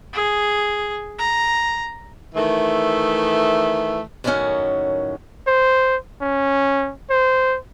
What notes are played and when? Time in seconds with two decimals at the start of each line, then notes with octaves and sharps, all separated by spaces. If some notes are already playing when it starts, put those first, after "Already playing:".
0.13 G#4
1.19 A#5
2.35 D#3 E3 A3
4.24 F#2 A2 D#3 E3 C#4 F#5
5.47 C5
6.21 C#4
7.10 C5